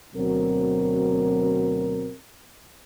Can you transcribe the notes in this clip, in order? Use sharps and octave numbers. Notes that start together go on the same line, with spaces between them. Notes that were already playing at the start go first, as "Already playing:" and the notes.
D2 B2 F#3 C4 A#4